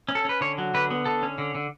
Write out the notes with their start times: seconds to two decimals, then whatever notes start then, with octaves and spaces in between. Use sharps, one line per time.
0.09 C#4
0.15 A4
0.25 C#4 B4
0.41 D3 C#5
0.58 F#3
0.74 D3 B4
0.90 B3
1.05 D3 A4
1.23 C#4
1.38 D3
1.55 D3